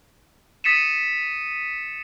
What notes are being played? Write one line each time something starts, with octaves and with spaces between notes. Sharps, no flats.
D#6 A6 B6 C#7 D#7 E7